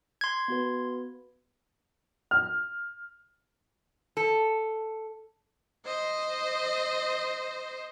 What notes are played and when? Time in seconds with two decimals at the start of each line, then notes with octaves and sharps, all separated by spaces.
0.21 C6 G#6
0.48 B3 F#4 B4
2.31 F6
4.17 A4
5.85 C5 D#5